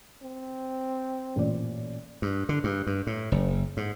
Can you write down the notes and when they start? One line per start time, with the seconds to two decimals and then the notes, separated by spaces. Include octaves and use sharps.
0.23 C4
1.36 A1 A#2 D5
2.22 G2
2.49 D3
2.64 G2
2.87 G2
3.07 A2
3.32 F#1
3.77 G#2